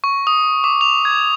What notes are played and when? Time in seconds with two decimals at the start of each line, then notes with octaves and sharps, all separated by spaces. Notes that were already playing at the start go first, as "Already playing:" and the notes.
0.04 C#6
0.27 D#6
0.64 D6
0.81 F7
1.05 G#6